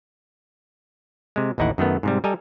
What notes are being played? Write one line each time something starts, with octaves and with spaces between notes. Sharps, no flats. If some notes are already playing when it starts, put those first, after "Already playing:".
C3 G#3
A1 D#2 D#4 E4 F#5
F#2 D#3 A3 B3
G#2 C3 G3
G3 A4 D#5 G#5 A#5